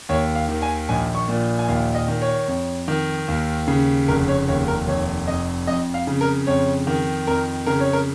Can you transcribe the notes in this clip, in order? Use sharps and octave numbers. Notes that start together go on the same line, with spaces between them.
D#2 C#5
F5
D#3
G#5
A#1 G#5
C#6
A#2
G#5
D#2 F5
D#5
D#3
C#5
F2
D#3
D#2
C#3
F1 A#4
C#5
D#2 C#5
A#4
F1 C#5
F2 D#5
F2 D#5
F5
C#3
A#4
F2 C#5
D#3
F2 A#4
C#3 A#4
C#5
A#4